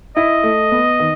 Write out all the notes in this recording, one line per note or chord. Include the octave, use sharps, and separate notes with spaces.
E4 D#5
A3
B3
D#3